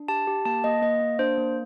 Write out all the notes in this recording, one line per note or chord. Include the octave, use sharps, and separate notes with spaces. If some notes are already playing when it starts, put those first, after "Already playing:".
Already playing: D4
G4 A5
G4
A#3 A5
A#3 D#5
A#3 D#5
A#3
D4 C5
A#3